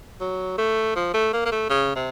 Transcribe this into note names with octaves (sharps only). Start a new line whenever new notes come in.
F#3
A3
F3
A3
A#3
A#3
A3
C#3
C3